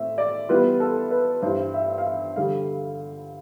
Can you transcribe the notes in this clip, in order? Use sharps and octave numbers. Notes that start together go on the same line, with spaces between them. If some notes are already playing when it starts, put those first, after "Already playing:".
Already playing: A2 C4 E5
D5
E3 G3 B3 F4 B4
A4
B4
G2 E3 G3 C5
E5
F5
E5
D3 G3 F5